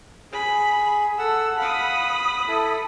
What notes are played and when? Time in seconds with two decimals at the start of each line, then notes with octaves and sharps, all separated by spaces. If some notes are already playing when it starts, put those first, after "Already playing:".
0.32 G#4 B5
1.18 A4 F#5 E6
1.58 F5 F#5 B5 D#6
2.48 E4 A4